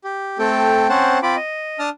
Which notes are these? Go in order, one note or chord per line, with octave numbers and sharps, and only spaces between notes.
G4
A3 C4 A4 G5
C4 C#4 C5 F#5 A5
C4 F4 B5 D6
D#5
D4 A5 D#6 F6